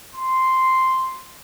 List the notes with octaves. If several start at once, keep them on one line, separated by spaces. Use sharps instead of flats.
C6